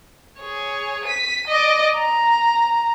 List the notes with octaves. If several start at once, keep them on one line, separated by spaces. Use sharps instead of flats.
G#4 C#5
B6 D#7
D5 D#5
A#5